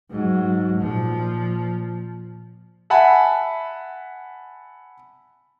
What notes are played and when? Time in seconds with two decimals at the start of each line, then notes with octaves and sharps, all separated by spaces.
0.11 G#2 F#3
0.80 A#2 F3
2.90 E5 F#5 G#5 A5 B5